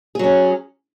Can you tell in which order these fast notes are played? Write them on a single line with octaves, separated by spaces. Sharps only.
G#4 F#3 C#4